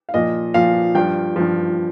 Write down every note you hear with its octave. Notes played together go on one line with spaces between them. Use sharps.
F5
A#2 F3 D#5
A#2 F3 F5
G2 F3 G5
G2 F3